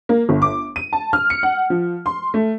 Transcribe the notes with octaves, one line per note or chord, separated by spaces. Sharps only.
A#3
G1
D6
D#7
A5
F6
C#7
F#5
F3
C6
A3